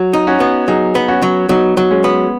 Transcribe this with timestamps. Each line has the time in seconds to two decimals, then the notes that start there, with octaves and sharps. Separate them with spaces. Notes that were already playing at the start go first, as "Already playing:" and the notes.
Already playing: F#3
0.13 D#4
0.27 C#4 F#4
0.40 B3
0.68 F#3 D#4 G#4
0.95 B3
1.08 C#4 F#4
1.22 F#3
1.49 F#3 B3 D#4
1.77 F#3
1.91 G#3 C#4
2.04 B3